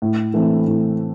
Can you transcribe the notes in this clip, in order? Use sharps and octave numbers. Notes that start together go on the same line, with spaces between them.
A2
E3 A3 C4 E4
A2